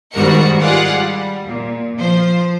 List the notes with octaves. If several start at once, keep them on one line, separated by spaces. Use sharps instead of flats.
G#2 D#3 G3 F#4 A#4 C#7
F4 G4 G#4 D5 F5 F#5
G3
A#2
F3 C5